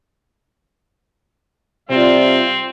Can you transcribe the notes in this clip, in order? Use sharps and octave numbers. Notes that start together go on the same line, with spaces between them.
C3 G3 C4 F4